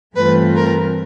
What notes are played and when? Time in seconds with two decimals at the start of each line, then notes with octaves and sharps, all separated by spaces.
0.15 G2 E3 A3 C4 F4 B4
0.56 A#4